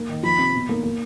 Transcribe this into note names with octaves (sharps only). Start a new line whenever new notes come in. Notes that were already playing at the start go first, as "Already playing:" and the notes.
Already playing: A#3
D#3
F3 B5
C3
B2
A#3
A#3